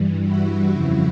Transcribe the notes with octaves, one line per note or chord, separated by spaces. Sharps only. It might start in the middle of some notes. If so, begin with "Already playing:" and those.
Already playing: G2 E3 G3
E4 F#4
F2 C#3 F3